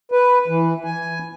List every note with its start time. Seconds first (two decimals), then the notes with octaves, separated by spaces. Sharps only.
0.12 B4
0.48 E3
0.84 G#5